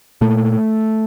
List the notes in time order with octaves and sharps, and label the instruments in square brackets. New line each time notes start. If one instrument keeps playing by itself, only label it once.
[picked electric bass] A#2 A3